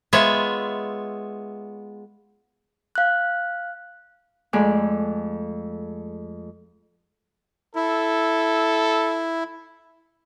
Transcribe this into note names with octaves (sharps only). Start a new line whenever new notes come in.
G#3 B3 F4 C#5 E5
F5 F#6
F2 G#3 A3 D5 G#5 D6
E4 A4